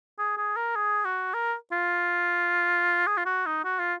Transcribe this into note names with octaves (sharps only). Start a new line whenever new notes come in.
G#4
G#4
A#4
G#4
F#4
A#4
F4
G#4
F4
F#4
D#4
F#4
F4